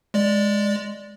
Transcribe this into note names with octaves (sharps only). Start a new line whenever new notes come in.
G#3 D5